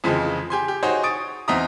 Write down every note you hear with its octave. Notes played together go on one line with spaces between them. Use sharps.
F2 C#3 E3 F3 G#3
G4 G#5 C6
G4
D#4 F#4 G#4 C5 C#5
C#6 D#6 A6 D7
E2 C4 D#4 E5 A#5 D#6